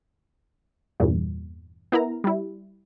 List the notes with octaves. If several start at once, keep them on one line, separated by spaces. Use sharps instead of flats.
E2 G2 A#2
B3 E4 A#4 A#5
G3 E4